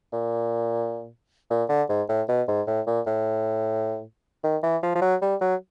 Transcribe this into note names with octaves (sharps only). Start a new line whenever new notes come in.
A#2
A#2
D3
G#2
A2
B2
G#2
A2
A#2
A2
D#3
E3
F3
F3
F#3
G3
F#3